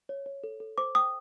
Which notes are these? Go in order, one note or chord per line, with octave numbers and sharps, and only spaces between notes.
C#5
C#5
A4
A4
C5 D6
G5 D#6